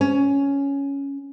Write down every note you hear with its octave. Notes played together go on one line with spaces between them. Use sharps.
C#4